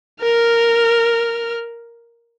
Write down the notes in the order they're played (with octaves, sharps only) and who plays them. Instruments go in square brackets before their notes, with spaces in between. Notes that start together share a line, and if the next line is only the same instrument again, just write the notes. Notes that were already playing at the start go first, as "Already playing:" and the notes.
[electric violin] A#4 F6